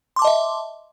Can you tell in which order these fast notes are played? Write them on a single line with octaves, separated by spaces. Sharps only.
C6 D6 A5 D#5 E5